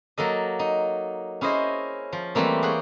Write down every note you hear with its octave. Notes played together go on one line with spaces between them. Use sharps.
F#3 A#3 A4 D#5
D#4
C#4 E4 G#4 C5 D#5
F3
E3 G3 A3 A#3 C4
G#4 C#5 F#5 G5